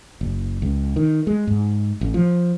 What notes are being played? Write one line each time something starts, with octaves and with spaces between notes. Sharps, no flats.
F#1
C#2
D#3
G#3
G#2
A1
F3